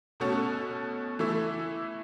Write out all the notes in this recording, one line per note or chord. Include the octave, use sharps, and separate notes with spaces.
B2 A3 C#4 F#4 A4
E3 A3 E4